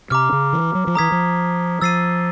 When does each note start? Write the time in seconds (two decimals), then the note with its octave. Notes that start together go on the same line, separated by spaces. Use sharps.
0.10 C3 A#5 D6 F6
0.32 C#3
0.53 E3
0.75 F#3
0.87 F3
0.95 E3 A#5 D#6 G#6 B6
1.12 F3
1.81 F3 E6 A6 C7 D#7